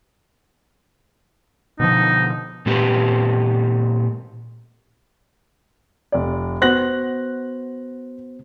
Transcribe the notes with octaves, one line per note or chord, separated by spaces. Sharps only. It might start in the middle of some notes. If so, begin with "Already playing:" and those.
B2 D3 F3 D#4
A#2 G#3 C4 G4 B4
F1 D5
B3 F#4 C5 F#6 A#6 F#7